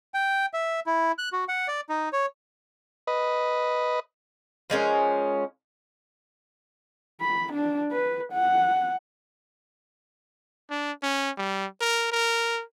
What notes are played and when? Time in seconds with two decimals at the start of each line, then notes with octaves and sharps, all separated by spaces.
0.14 G5
0.53 E5
0.86 E4
1.18 F#6
1.33 F#4
1.49 F#5
1.68 D5
1.89 D#4
2.13 C#5
3.07 B4 D#5
4.70 F3 G#3 C#4 A#4
7.20 B5
7.53 D4
7.91 B4
8.32 F#5
10.71 D4
11.03 C#4
11.38 G3
11.81 A#4
12.12 A#4